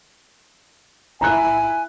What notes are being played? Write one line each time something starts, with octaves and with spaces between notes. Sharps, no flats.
E4 G#5 A#5 F#6